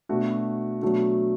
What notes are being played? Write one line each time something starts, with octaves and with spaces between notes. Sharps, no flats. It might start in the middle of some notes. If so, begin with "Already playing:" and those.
B2 A3 D4 F#4
B2 F#3 A3 D4 F#4